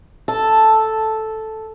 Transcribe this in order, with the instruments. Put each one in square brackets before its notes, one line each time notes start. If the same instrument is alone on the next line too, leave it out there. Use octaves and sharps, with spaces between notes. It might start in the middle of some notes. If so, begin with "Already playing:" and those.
[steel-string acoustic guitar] A4